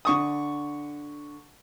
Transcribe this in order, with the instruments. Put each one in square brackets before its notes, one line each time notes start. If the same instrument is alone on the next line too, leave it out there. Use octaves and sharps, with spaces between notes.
[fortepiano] D3 C#6 D#6